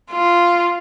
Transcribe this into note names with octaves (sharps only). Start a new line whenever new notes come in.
F4